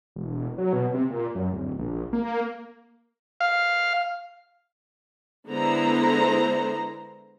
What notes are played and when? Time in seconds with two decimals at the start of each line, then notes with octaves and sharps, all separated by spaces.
0.16 E1
0.58 F#3
0.73 B2
0.94 C3
1.10 A#2
1.35 F#2
1.53 D1
1.78 A#1
2.13 A#3
3.41 F5
5.49 D3 G#3 B3 E4 C5 A#5